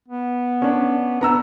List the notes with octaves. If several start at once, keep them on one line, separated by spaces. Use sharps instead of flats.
B3
C#4 D4
B3 D4 A#5 E6